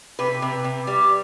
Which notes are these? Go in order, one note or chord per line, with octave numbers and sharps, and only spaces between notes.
C3 B4
C3
C3
G3